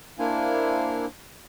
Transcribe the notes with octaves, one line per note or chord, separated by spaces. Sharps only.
A#3 D4 E4 C5 F5 G#5